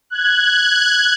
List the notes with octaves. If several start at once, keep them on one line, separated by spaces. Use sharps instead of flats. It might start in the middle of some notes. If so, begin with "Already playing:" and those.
F#6 G#6